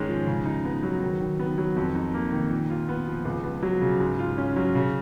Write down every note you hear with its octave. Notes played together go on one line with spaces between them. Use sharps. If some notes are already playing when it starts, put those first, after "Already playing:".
Already playing: G#2 D#3 G#3 C#4
F3
C#3
D#4
B3
F#3
D#3
D#3
B3
F#3
F2
D#4
A#3
D#3
A#2
F4
B3
F3
C#2
B3
F#3
C#3
G#2
F4
C#4
F#3
C#3